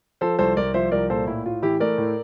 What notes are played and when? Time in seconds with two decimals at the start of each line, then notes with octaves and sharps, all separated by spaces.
0.21 F3 A4 C5
0.39 C2 A4 C5
0.57 C2 A#4 D5
0.74 F3 C5 E5
0.92 C2 A#4 D5
1.10 A#2 A4 C5
1.27 A2 E4
1.46 A2 F4
1.62 E3 E4 G4
1.80 A3 A#4 D5
1.98 A2